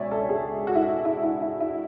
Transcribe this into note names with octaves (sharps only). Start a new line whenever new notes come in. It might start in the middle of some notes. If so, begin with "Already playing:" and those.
Already playing: C#2 B2 C#5 D5 E5 G#5
A4
G#4
F#4
E4
F#4
E4
E4
E4
E4